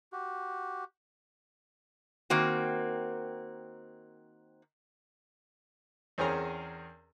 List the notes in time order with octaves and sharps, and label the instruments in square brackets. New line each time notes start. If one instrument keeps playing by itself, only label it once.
[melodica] F#4 G4
[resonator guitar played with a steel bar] D#3 A#3 C4 F#4
[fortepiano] E2 C4 C#4 G#4 A#4 A#5